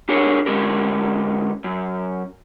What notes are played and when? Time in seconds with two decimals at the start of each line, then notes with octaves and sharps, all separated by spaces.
0.09 D4 G4 G#4 A#4 C#5
0.46 D3 G#3 C#4 G4 A#4
1.64 F#2